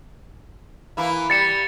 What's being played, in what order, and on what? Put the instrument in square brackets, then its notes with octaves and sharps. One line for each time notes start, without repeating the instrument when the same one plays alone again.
[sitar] E3 A#3 E4
[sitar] G3 [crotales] A6 C#7 E7